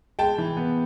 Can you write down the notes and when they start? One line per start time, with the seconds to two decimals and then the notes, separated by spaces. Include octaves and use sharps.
0.19 G#3 G5 A5
0.38 E3
0.57 B3